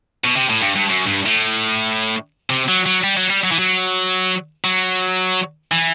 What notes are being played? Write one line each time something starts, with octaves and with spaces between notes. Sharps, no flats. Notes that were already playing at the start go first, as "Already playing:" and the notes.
B2
C3
A2
G2
G2
F#2
G2
A2
C3
F#3
F#3
G3
F#3
G3
F#3
E3
F#3
F#3
E3